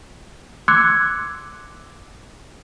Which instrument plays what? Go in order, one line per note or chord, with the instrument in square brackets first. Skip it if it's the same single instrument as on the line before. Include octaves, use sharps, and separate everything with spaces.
[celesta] C6 D6 E6 F#6 G#6 C#7